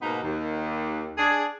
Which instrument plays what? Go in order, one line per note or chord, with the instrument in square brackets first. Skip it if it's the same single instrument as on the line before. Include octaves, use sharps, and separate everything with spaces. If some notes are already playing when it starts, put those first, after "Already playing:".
[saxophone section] G#2 B2 A#3 B3 D#4
D#2
D4 G#4